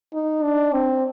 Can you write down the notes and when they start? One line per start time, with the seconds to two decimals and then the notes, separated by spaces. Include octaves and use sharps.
0.13 D#4
0.43 D4
0.73 C4